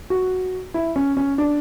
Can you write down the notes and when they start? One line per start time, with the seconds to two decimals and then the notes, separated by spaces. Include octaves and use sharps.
0.10 F#4
0.74 E4
0.96 C#4
1.17 C#4
1.38 D4